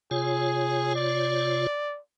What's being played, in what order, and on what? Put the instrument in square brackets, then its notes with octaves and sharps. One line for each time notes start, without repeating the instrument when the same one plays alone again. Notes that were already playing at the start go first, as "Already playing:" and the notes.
[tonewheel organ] C3 F4 C#5 [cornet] G#4
[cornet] D5